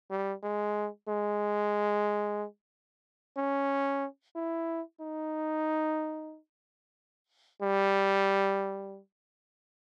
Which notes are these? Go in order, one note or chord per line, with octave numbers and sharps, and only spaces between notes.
G3
G#3
G#3
C#4
E4
D#4
G3